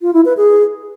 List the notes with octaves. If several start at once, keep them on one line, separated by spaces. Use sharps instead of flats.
F4
E4
B4
G#4